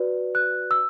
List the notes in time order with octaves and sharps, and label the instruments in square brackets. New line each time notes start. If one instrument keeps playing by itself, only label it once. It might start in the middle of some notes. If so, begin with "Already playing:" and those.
Already playing: [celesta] F#4 B4 D5
F#6
E6